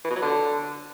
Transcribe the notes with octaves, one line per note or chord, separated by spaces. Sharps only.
E3
B2
F#3
D3